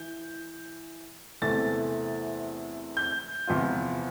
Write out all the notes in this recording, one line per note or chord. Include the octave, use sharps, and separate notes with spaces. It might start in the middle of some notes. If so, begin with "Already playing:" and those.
Already playing: E3 G6
E2 C3 E3 A3 A6
G6
E2 C3 F3 B3 F4